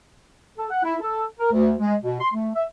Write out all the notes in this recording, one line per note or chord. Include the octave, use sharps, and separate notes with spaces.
A4
F#5
E4
A4
A#4
D2
G#3
B2
C6
A3
E5